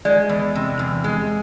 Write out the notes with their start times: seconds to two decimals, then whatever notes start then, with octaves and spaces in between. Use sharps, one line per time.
0.05 G#3 D5
0.29 E2
0.55 C3
0.79 E2
1.04 G#3